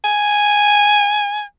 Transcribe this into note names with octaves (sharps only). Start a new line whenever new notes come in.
G#5